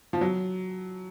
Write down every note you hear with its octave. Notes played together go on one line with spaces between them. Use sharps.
F3
F#3